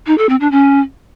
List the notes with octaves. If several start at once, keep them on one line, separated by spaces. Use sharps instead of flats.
D#4
A4
C4
D4
C#4